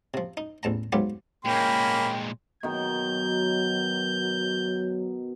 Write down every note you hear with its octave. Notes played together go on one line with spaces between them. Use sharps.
C3 F3
D#4
A1 E2 A5 A#5
G#2 F#3 B3 F4 G4
A#2 G#3 A#3 C#4 G5 B5
B2 D#3 F#3 G6